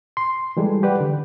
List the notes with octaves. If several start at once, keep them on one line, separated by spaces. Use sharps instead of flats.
C6
E3 G3 G#3 A4
G4 B4 D5 F#5
D3